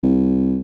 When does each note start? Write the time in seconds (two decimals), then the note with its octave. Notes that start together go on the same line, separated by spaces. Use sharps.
0.04 C2